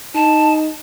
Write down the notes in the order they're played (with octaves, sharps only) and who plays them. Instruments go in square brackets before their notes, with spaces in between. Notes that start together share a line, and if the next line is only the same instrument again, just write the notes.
[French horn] D#4 [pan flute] A5